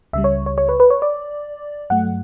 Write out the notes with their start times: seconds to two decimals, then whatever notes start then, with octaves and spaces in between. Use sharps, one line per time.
0.13 C#2 C#3 G3 E5
0.24 C#5
0.46 C#5
0.58 C#5
0.69 B4
0.80 B4
0.90 C#5
1.02 D5
1.90 G2 F#3 A3 F#5